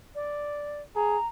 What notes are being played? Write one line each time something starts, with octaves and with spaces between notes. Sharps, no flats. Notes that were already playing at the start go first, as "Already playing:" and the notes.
D5
G#4 A#5